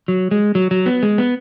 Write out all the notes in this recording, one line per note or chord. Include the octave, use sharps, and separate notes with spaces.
F#3
G#3
F#3
F#3
B3
G#3
B3